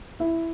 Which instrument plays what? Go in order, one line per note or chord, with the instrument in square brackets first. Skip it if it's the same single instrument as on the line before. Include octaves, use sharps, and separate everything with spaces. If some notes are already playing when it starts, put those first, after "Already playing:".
[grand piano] E4